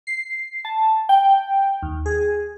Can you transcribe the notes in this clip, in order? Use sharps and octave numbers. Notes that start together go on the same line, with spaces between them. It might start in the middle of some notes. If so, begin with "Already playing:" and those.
C7
A5
G5
D#2
G#4